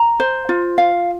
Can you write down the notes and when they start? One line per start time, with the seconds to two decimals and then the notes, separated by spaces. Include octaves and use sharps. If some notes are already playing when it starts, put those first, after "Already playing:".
Already playing: A#5
0.20 C5
0.49 F4
0.78 F5